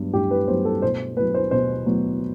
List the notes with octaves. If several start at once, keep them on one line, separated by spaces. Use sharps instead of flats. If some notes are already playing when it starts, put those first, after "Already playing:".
Already playing: G2 F#3 B3
G2 G4
B4
F#3 B3 C5
A4
B2 C5
F#3 B3 B4
C5
B2 C5
F#3 B3